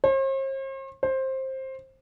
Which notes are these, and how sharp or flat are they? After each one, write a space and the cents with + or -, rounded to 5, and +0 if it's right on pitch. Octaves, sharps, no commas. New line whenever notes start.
C5 +45
C5 +15